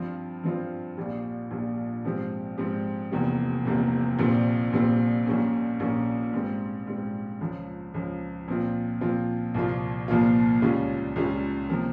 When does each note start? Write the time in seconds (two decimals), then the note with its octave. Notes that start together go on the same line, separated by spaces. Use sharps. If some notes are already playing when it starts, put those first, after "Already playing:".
Already playing: G2 F3 C4 F4
0.44 G2 F3 C4 F4
0.97 A#1 A#2 G3
1.51 A#1 A#2 G3
2.05 G#2 F3 C4 G4
2.58 G#2 F3 C4 G4
3.12 F1 E2 C3 G3 A#3
3.65 F1 E2 C3 G3 A#3
4.19 A#1 A#2 G3 C4
4.73 A#1 A#2 G3 C4
5.26 A#1 A#2 G3 A#3 C#4
5.80 A#1 A#2 G3 A#3 C#4
6.33 G#2 G3 C4
6.87 G#2 G3 C4
7.41 C#2 C#3 F3
7.94 C#2 C#3 F3
8.48 A#2 F3 C4 F4
9.01 A#2 F3 C4 F4
9.54 C2 A#2 F3 A#3 F4
10.08 C2 A#2 F3 A#3 F4
10.62 C#2 C#3 G3 C#4 F4
11.16 C#2 C#3 G3 C#4 F4
11.69 C3 F3 A#3